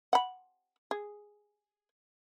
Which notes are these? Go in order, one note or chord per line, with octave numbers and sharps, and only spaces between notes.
F#5 B5
G#4